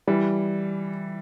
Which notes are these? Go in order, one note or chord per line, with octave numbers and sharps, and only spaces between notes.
E3 G3